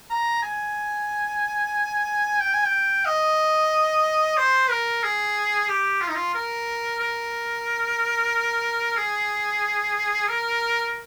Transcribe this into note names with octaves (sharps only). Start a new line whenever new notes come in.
A#5
G#5
G5
G#5
G5
D#5
C5
A#4
G#4
G4
F4
D#4
F4
A#4
A#4
G#4
A#4